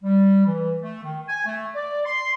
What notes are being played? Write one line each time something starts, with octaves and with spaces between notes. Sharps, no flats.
G3
E3
A3
D#3
G#5
A3
D5
C6